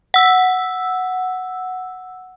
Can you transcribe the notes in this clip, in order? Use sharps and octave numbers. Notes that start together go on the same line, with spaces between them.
F#5 E6